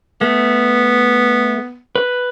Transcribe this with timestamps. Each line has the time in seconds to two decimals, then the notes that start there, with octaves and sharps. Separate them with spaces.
0.21 A3 B3
1.96 B4